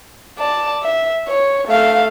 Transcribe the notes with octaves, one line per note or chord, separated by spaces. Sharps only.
D5 A5
E5
C#5
A3 F5